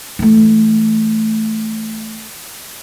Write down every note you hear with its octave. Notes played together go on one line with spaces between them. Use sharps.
E3 A3